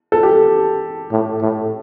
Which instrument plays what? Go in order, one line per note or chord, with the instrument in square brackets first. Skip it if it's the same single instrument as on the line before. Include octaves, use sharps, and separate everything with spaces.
[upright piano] A4
G4
[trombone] A2
A2